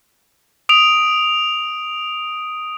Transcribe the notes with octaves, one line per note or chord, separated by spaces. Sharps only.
D#6 D7 F7